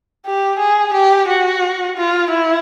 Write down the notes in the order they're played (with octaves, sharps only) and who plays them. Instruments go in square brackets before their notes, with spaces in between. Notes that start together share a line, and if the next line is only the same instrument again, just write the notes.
[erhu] G4
G#4
G4
F#4
F4
E4